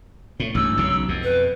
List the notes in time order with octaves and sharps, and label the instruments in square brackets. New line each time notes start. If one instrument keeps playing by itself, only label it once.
[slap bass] A2
[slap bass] A1 G2 [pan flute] E6
[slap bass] B1 C#3
F2 B2
[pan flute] B4